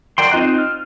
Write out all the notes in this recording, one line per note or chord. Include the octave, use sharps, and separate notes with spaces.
F#4 A#4 D5 G5 C6
C4 D#4 F4 D#5 F#6
F6